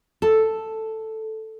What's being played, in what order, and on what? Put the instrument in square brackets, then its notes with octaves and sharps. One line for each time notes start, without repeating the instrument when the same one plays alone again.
[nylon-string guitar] A4